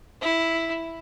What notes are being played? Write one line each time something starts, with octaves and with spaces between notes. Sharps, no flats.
E4